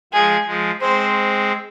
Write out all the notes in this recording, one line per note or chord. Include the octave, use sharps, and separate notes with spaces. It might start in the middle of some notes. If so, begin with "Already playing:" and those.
F3 G#3 G#4
F3 G#3
G#3 C4 C5